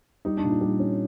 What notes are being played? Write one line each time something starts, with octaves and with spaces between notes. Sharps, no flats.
G3 D#4
D4
A#2
D#4
G3
C#4